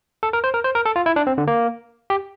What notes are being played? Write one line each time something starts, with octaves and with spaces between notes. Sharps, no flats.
A4
A#4
C5
A#4
C5
A#4
A4
F4
E4
D4
C4
D3
A#3
G4